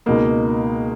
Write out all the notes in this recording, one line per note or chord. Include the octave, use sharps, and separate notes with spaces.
C#2 B2 A#3 D#4